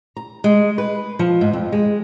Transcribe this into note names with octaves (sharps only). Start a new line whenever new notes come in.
A#5
G#3
B4
F3
G#2
F2
G#3